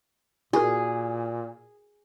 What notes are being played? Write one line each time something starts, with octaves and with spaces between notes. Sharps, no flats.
A#2 E4 F#4 G#4 A#4